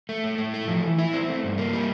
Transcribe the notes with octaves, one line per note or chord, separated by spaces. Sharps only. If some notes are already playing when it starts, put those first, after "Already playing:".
A3
A2
A2
A3
F3
E3
E4
C4
A3
G2
A#3
G3